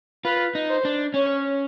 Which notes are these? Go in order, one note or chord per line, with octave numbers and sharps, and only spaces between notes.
F4 B4
D#4
C5
D4
C#4 C#5